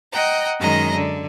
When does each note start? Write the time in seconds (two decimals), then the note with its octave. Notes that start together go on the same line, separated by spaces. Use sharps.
0.12 D#5 F#5 G5 A#5
0.59 F#2 D#3 G#3 D#5 A#5
0.94 D3